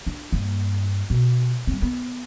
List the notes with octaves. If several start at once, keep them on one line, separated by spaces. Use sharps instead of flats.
D4
G2 A#3
B2
G3 C4
B3